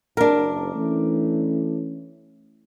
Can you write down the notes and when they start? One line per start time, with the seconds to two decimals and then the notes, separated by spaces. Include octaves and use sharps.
0.17 F#1 D4 A#4
0.75 E3 A3 C#4